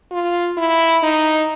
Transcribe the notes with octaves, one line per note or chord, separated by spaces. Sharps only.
F4
E4
D#4